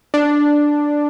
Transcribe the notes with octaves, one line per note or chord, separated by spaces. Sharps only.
D4